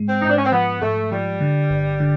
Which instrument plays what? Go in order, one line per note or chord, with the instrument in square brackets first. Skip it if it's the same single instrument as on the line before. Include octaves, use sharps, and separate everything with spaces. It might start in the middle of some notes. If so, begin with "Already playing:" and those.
Already playing: [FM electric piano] G#2 G#3
[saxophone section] C4
[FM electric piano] G#2 [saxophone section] D#4
[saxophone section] D4
C#4
C4
[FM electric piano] F3 [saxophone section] B3
[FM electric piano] G#2 [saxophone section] A3
[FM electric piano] F3 [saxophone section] G3
[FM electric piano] D3
G1
D3